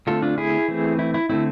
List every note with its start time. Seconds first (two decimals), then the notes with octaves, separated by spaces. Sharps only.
0.07 D3 A3 C4 F4 A4
0.22 D4 F4
0.38 E4 G#4
0.68 E3 A3 C4
0.99 E4
1.14 E4
1.29 D3 A3 C4 E4